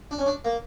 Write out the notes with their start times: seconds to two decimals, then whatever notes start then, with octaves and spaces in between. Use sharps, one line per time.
0.11 D4
0.18 C#4
0.26 D4
0.45 A#3